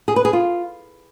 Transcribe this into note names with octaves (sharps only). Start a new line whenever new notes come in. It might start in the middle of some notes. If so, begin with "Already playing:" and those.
G#4
B4
G#4
F4